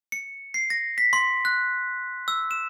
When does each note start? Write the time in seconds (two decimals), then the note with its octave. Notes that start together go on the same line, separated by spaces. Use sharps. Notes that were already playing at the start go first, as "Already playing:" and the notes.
0.12 C#7
0.54 C7
0.70 A#6
0.98 B6
1.13 C6
1.45 F#6
2.28 E6
2.51 E7